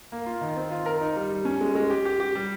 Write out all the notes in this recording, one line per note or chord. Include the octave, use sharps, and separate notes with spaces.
A#3
F4
D#3
C4
F4
A#4
D#4
G3
G3
C#4
G#3
G#3
G4
G4
G4
G3